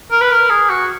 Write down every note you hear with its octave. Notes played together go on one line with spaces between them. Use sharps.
A#4
B4
A#4
G#4
F#4